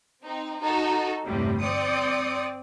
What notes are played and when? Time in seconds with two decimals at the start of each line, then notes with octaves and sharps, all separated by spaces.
0.24 C4 D#4
0.61 D#4 F#4 A4
1.26 G1 E2 A2 C3 G3
1.61 C4 D5 D#6 C#7